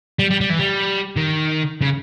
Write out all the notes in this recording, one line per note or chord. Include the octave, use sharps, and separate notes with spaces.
G3
G3
G3
E3
G3
D#3
C#3